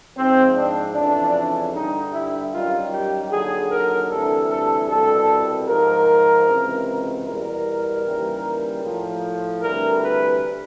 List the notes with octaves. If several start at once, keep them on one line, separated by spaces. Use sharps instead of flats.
G#2 F3 C4
D4
F2 C#3 E3 D4
G2 D3 G3 D#4
E4
F#2 D#3 G3 F4
G4
D#2 D3 F#3 G#4
A#4
D2 C3 E3 G3 A4
A4
C2 B2 G3 A4
G#2 F3 A#4
C#2 C3 E3
E2 B2 G3 A#4
D#2 C#3 E3 G3
A2 F3
D2 C3 E3 G3 A#4
B4